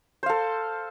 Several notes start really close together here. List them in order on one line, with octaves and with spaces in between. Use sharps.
C5 F5 A4